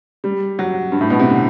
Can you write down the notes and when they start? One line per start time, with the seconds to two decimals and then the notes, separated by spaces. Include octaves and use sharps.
0.24 G3
0.59 F#3
0.92 G2
1.01 A2
1.10 B2
1.19 C3
1.29 D3